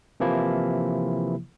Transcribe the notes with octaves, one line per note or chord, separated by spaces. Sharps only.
C3 E3 F3 A#3 E4